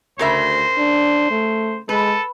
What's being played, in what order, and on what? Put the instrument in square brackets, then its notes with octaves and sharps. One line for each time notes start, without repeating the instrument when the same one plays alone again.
[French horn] D2 [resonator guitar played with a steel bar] C#3 A#4 E5 [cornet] C5
[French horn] D4
A3
[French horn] G#3 [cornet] A4 [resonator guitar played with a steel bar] B4